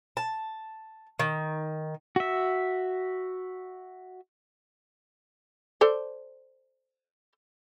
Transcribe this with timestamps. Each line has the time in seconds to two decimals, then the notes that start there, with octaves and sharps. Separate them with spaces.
0.17 A5
1.19 D#3
2.16 F#4 E5
5.81 A4 C5 D5